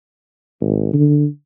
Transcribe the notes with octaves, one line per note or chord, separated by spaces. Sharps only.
G#1
D3